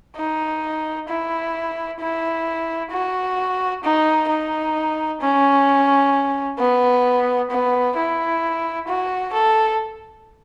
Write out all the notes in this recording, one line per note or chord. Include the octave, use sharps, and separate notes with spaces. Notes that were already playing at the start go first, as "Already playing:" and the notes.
D#4
E4
E4
F#4
D#4
D#4
C#4
B3
B3
E4
F#4
A4